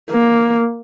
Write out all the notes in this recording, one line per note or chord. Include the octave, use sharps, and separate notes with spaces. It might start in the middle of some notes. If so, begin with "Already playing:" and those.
A#3